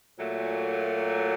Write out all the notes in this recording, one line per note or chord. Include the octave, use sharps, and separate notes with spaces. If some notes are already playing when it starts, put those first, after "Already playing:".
A#2 F#3 A3